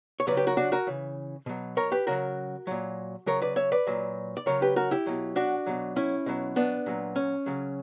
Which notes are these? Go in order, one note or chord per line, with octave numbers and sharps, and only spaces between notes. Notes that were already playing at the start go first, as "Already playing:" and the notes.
C#5
C#3 F#3 B4 D5
G4 B4
F#4 A#4
D4 F#4
F#4 A#4
C#3 E3
B2 F#3
A#4 C#5
G4 B4
C#3 F#3 F#4 A#4
A#2 F#3
C#3 F#3 A#4 C#5
B4 D5
C#5 E5
B4 D5
A#2 F#3
D5
C#3 F#3 A#4 C#5
G4 B4
F#4 A#4
E4 G4
B2 F#3
D4 F#4
B2 F#3
C#4 E4
B2 F#3
B3 D4
A#2 F#3
C#4
C#3 F#3